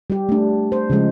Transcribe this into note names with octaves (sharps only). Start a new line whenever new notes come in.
G3 G4
A3 D4
C5
C#3 F3 G#3